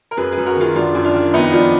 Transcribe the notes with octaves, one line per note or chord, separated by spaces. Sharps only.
A#4
F#2 G#4 B4
G#4 B4
F#2
F#4 A#4
D#3 F4 G#4
F#2 D4 F4
F#2
D4 F4
D#3
F2 B3 D#4
F3 D4 F4